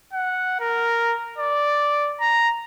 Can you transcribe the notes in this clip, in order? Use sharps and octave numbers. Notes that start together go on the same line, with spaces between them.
F#5
A#4
D5
A#5